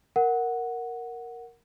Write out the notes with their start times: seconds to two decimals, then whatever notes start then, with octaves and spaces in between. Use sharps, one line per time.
0.16 A#4 F#5